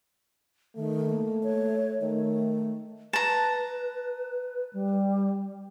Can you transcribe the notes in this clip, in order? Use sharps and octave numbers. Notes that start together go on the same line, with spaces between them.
D#3 A3
A#3
C#5
D#3 A3
B4 A5 A#5
G3